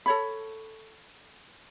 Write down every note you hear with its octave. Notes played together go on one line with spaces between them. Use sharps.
A4 C#5 B5